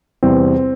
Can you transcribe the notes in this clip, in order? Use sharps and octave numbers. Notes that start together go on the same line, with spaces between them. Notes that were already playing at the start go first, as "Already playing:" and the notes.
E2 C3 E3 G3 C4